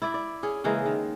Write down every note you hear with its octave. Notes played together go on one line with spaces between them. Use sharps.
E4 D5 E5
D5
C#4 G#4
C#3 E3 G#3 A#3
D#3